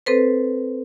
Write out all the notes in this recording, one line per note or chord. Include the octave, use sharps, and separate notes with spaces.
C4 A4 B4 C5